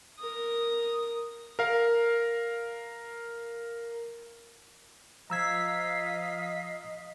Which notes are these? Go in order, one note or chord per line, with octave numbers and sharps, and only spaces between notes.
A#4 D#6
A#4 F5
F3 D#5 F5 A#5 E6 G#6 B6